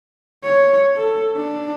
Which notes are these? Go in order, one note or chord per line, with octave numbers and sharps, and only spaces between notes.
C#5
A4
D4